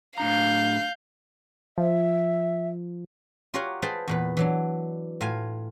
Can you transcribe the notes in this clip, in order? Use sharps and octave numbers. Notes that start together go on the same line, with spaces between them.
A2 D4 F5 A#5 G6
F3 E5
F4 G4 A#4 C#5 F5 F#5
G#4 B4 C5 F5 G5 A5
E2 A#2 B4
E3 F#3 D4
A2 F4 F5 G#5